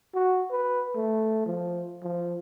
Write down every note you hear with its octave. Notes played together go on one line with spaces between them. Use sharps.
F#4
B4
A3
F3
F3